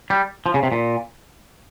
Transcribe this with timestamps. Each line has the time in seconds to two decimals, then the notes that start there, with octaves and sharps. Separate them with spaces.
0.10 G3
0.46 F3
0.54 C#3
0.63 C3
0.72 A#2